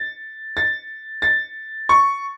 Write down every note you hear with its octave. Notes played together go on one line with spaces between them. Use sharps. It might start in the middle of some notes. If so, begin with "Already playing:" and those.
Already playing: A6
A6
A6
C#6